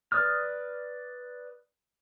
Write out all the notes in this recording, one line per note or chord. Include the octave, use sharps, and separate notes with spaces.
B4 D5 D#6 F6